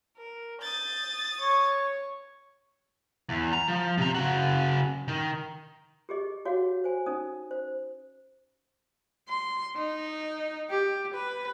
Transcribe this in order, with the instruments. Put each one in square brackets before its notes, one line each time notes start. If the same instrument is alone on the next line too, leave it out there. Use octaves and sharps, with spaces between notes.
[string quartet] A#4
[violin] D#6 A6 [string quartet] G6
[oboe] C#5 [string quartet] C#6
[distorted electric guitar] E2
A#5
F3
C3 A#5
C#3 F#4
D#3
[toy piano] G4 G#4 D#5
F#4 G#4 C#5 F5 F#5
C5 G#5
C#4 D#4 D#6
C5
[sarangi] C6
D#4
G4
B4